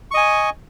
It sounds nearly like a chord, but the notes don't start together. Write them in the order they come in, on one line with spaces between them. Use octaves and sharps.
C#6 D#5 G#5